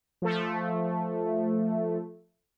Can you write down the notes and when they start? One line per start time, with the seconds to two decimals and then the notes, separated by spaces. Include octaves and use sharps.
0.22 F3 A3